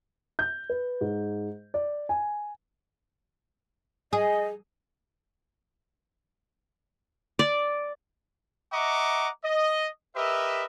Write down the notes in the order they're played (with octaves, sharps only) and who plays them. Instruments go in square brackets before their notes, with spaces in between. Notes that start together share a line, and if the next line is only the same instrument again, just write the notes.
[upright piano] G6
B4
G#2
D5
G#5
[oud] G#4 [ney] D#5
[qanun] D5
[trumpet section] D#5 E5 F#5 A#5 C#6 D6
D#5
G4 A#4 B4 D#5 E5